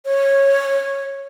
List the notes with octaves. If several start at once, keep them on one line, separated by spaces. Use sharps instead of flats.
C#5